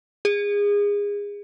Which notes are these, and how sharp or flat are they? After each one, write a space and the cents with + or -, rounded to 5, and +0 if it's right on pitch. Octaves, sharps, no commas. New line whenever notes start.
G#4 -25